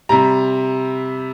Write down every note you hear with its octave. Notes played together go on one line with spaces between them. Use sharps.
C3 G3 A#5